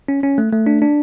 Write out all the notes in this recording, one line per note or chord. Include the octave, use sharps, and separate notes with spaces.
C#4
C#4
A3
A3
D4
D4